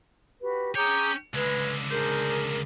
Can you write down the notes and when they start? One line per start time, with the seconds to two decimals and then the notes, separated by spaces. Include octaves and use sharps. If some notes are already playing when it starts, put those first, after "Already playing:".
0.41 F#4 G4 B4
0.75 C#4 G#4 C#5 G5 A#5 D6
1.34 C#2 D3 G#3 B4
1.90 D4 G#4 A#4 C5